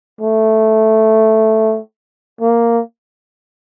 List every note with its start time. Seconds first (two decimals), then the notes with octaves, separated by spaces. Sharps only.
0.21 A3
2.41 A#3